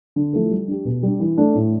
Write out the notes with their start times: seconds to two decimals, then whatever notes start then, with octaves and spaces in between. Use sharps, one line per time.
0.16 D3
0.33 F3 A3 E4 A4
0.51 G3
0.68 D4 G4
0.85 B2
1.03 G3 D4
1.20 E3
1.37 A3 D4
1.55 A2